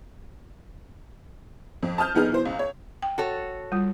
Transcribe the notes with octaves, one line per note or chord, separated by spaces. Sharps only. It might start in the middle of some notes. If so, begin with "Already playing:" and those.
F2
A5 D#6 F6 G6
F1 B3 D#4 G#4 F6
B2 E3 C5
C#2
C#5
G5
F#4 A4 C#5
G3 F4